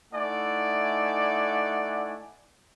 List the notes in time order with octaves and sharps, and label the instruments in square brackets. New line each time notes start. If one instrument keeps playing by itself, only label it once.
[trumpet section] A3 D#4 E4 D5 F#5 G#5